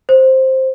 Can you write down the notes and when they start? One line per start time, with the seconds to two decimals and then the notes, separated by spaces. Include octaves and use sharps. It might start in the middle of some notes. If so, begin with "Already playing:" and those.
0.09 C5